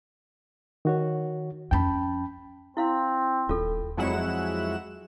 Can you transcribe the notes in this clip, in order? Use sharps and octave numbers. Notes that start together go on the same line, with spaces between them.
D#3 F#4 C#5
F2 C#4 G5 A5 B5
C4 E4 F5 C6
D#1 F4 A4
F2 F#3 G#3 E4 F#5 E7